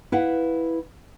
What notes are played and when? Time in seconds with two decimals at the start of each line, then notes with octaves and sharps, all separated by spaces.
0.12 E4 B4 F5 F#5